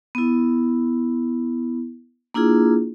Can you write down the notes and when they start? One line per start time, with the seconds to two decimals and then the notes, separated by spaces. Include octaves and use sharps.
0.15 B3 E4
2.34 A#3 D4 E4 F4 G#4